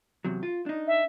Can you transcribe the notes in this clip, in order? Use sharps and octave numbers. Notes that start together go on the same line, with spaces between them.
E2 C3 F#3
F4
D4 D#4
E5